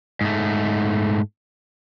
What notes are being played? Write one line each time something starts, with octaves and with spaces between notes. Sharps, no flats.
G#2 A3